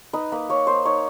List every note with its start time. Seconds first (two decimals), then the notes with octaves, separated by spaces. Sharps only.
0.13 D#4 B4
0.32 A#3 B4
0.49 A#3 C#5
0.67 A#3 C5
0.85 D#4 C#5